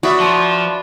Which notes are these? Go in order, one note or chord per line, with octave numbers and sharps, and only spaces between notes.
D4 F#4 B4 E5 D#6
F3 C6